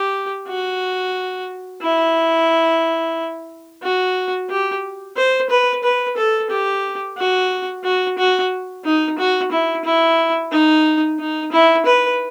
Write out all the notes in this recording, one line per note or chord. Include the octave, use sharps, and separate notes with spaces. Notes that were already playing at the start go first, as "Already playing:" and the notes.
Already playing: G4
F#4
E4
F#4
G4
C5
B4
B4
A4
G4
F#4
F#4
F#4
D#4
F#4
E4
E4
D#4
D#4
E4
B4